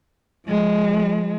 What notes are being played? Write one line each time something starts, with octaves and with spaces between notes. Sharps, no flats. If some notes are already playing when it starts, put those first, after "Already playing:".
F3 G#3